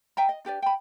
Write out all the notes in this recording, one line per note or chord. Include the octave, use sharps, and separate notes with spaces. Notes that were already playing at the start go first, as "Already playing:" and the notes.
E5 G5 A#5
D#5
D4 G4 B4 D5
G5 B5